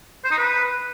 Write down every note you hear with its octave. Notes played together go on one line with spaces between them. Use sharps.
C5
D#4
B4